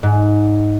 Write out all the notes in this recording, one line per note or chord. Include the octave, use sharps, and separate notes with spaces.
G#2